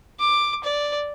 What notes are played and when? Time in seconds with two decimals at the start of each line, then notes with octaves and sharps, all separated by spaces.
0.20 D6
0.64 D5